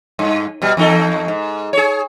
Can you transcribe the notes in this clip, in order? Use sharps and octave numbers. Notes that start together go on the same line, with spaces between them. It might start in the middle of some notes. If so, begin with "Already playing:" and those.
G2
B2 G3
E2 D#4 A4
G#2
G#4 C#5